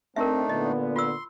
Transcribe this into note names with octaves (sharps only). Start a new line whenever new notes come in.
A3 C4 D4 D#4 A#4 E5
A#2 D3 B3 D#5
F4 C6 E6